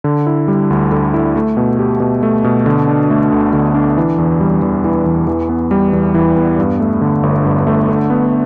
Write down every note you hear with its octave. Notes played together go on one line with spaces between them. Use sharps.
D3
E4
G3
D2
D3
E4
A3
B2
G4
B2
A3
B2
D3
D4
A3
D2
D3
D4
E3
E2
G3
E2
E3
E2
E3
B3
G3
E2
E3
B3
G2
A3
D3
G1
G2
A3
D3
B3